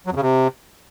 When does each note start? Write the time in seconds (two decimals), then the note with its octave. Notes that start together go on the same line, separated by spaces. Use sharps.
0.06 F#3
0.11 F2
0.16 C#3
0.22 C3